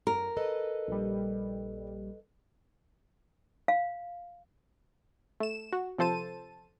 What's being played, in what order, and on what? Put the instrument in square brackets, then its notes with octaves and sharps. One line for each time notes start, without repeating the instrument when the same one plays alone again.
[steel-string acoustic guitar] F#2 [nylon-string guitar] A#4
[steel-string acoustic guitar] A4 B4 D#5
[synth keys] A#1 G3
[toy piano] F5
[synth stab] A3 E7
F#4
C3 F3 A4 C5 A5 D#7